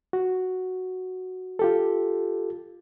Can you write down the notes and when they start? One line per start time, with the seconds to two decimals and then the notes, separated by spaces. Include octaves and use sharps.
0.13 F#4
1.59 F4 G4 A4